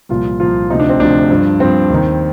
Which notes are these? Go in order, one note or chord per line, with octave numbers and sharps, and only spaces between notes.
C2 A#2 F3 F4
C2 A#2 F3 F4
D2 C3 F3 D#4
D4
C4
D2 C3 F3 D4
G2 F3
G2 F3 C4
D#2 D#3